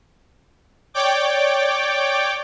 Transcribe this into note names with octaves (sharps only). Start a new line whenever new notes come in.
C#5 D5 G5 D6